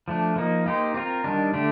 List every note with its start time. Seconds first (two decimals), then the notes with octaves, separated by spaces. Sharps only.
0.08 F3 A3 D4
0.36 F3 A#3 D#4
0.66 A#3 D#4 G4 C5
0.94 C4 F4 A#4
1.24 D#3 G3 D4
1.54 D3 A3 D4 G4